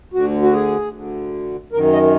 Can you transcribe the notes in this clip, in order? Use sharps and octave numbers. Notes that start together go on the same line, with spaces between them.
D2 D3 F#4
F#4
G#4
D2 D3
F#2 D#3 A#4
D#5